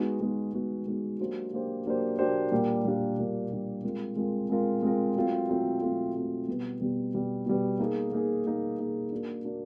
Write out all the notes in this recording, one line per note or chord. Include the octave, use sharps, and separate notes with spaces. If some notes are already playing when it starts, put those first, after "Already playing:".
Already playing: G#3 B3 D#4 F#4
G#3 B3 D#4 F#4
G#3 B3 D#4 F#4
G#3 B3 D#4 F#4
F#3 A#3 D4 G4 C5
F#3 A#3 D4 G4 C5
F#3 A#3 D4 G4 C5
F#3 A#3 D4 G4 C5
A#2 G3 A#3 D4 G4
A#2 G3 A#3 D4 G4
A#2 G3 A#3 D4 G4
A#2 G3 A#3 D4 G4
G#3 C4 F4 A#4
G#3 C4 F4 A#4
G#3 C4 F4 A#4
G#3 C4 F4 A#4
F#3 A3 C4 F4
F#3 A3 C4 F4
F#3 A3 C4 F4
F#3 A3 C4 F4
B2 G3 B3
B2 G3 B3
B2 G3 B3
B2 G3 B3
A#3 D#4 G#4
A#3 D#4 G#4
A#3 D#4 G#4
A#3 D#4 G#4
A#3 D4 F#4 A#4
A#3 D4 F#4 A#4